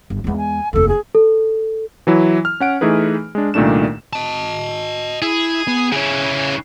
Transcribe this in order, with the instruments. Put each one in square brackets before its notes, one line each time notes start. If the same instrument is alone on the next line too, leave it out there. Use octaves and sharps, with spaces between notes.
[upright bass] G1
[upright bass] E2 G#3 [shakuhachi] B3
[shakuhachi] G#5
[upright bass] F1 D#2 [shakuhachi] A4
[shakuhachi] G#4
[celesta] A4
[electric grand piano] E3 F#3 E4
F6
C#4 F#5 D7
E3 A3 D#4 G#4 B4
G#3 D4
C2 A#2 D#3 A3 D4 E7
[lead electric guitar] D#5 A5
[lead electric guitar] E4 [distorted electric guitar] G#4
[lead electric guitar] B3
[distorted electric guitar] C#3 E3 [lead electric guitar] G#4 C#5